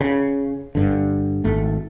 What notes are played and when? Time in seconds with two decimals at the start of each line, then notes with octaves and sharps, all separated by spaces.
0.01 C#3
0.75 G1 G2 D3
1.44 G#1 A3